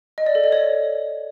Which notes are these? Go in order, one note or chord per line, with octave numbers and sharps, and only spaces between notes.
D#5
D5
A4
D#5
C#5